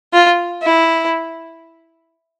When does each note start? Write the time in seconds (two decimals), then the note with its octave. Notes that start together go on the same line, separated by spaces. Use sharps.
0.13 F4
0.63 E4